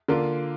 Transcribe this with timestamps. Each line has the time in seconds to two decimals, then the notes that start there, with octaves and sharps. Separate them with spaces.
0.08 D3 A#3 F4